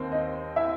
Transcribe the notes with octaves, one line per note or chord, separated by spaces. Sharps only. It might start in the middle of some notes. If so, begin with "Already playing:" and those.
Already playing: D#2 D#3 C4 C5
D#4 D#5
E4 E5